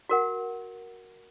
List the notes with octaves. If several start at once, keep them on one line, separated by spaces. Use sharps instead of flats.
F#4 A#4 F#5